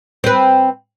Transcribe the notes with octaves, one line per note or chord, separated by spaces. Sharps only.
C4 B4